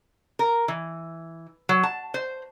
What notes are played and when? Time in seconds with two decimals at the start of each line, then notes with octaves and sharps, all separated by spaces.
0.39 A#4
0.68 E3
1.69 F#3
1.83 A5
2.14 C5